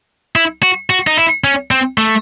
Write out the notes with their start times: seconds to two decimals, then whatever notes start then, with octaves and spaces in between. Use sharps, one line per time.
0.36 E4
0.63 F#4
0.90 F#4
1.07 D#4
1.17 E4
1.44 C#4
1.71 C4
1.98 A3